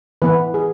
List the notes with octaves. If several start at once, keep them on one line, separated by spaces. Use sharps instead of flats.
E3 B3 B4
G#4